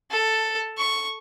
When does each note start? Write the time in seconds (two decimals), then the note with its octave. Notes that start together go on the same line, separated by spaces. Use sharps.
0.11 A4
0.78 C#6